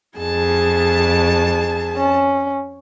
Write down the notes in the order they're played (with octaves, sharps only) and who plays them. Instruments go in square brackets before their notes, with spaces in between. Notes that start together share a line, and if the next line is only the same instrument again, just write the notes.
[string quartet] F2 A5 [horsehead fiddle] G#4
[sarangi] C#4